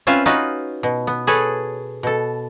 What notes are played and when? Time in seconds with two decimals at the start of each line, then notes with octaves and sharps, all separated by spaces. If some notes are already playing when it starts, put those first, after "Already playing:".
0.07 C4 C#4 F4 B4 E5 F5
0.26 C#4 D#4 F4 F#4 B4 C#5
0.83 B2
1.07 B3
1.27 G#4 A4 B4 C#5
2.03 B2 A4